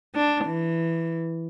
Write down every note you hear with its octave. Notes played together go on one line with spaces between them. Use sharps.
D4
E3